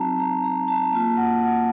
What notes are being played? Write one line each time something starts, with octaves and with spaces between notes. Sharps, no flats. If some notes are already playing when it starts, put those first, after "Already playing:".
Already playing: F#3 C4 D#4 F#4 A5 A#5
A#5
A#5
A5
A#3 F4 A5
F#5
F#5